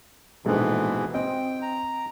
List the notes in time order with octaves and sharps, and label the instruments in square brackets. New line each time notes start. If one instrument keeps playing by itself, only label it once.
[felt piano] A#1 G#3 A4 [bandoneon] G#2 B2 E3
[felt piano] C4 D#5 [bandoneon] G5
[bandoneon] A#5